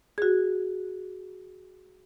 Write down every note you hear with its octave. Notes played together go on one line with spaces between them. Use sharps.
F#4 G#4